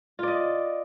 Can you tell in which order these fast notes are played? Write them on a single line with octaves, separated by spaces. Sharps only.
F4 D5 D#5